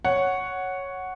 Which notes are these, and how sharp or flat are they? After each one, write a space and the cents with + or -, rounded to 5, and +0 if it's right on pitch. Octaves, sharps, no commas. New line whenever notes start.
C#5 +0 F#5 +0